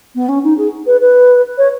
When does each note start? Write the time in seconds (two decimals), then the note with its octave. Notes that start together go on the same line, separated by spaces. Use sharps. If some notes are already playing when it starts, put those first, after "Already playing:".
0.15 B3
0.28 C#4
0.43 D#4
0.57 G#4
0.86 B4
1.00 B4
1.57 C#5